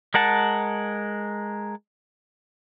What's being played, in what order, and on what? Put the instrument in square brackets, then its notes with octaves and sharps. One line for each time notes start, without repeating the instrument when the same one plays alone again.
[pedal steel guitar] G#3 A#4 F#5 A5